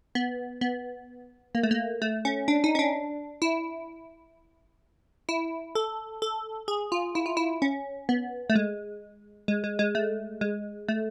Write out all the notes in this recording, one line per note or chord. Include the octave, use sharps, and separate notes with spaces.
B3
B3
A#3
A3
A#3
A3
C#4
D4
D#4
C#4
D4
E4
E4
A4
A4
G#4
F4
E4
F4
E4
C#4
B3
A3
G#3
G#3
G#3
G#3
A3
G#3
A3